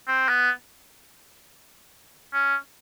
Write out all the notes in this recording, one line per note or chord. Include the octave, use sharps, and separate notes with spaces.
C4
B3
C#4